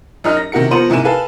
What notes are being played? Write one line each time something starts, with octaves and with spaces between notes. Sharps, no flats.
F#2 D#4 F6
A#6
C3 D#3 F#4 A#4 C#7
F3 B3 A#4 C5 D#7 F#7
G#2 C3 A#3 E4 G#5 E7
A4 B4 F5 G#5